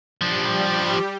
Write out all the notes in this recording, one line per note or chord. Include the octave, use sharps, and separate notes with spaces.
F3 G3 D4 G4